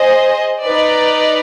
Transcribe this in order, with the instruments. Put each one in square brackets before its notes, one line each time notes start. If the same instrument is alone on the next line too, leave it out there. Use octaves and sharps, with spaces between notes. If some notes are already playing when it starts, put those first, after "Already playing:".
Already playing: [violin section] G#4 C5 D#5
D#4 B4 D5